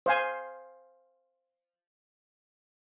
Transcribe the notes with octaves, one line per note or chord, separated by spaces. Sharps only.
C5 F5 G#5